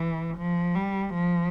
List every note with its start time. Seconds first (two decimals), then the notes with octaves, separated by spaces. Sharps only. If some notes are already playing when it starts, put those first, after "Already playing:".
Already playing: E3
0.38 F3
0.75 G3
1.14 F3